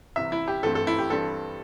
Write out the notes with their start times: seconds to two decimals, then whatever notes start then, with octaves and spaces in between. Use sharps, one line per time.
0.16 C2 C3 E3 E5
0.32 E4
0.48 G4
0.63 G1 G2 E3 A3 C4 A4
0.75 A4
0.87 E4
0.99 G4
1.10 G2 E3 G3 C4 A4